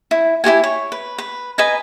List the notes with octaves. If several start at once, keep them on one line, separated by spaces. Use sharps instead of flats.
E4
E4 F#4 G4 G#5
C#5
B4
B4
B4 D#5 G#5 A#5